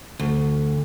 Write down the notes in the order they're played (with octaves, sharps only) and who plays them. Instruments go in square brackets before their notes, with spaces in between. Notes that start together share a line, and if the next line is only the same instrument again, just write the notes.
[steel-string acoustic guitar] D2